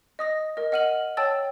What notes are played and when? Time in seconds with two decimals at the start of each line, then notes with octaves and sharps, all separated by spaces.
0.19 D#5 D#6 A#6
0.57 A#4 D#5
0.72 D#5 F#5 F6 D#7 F#7
1.17 C#5 G5 A5 E6 A6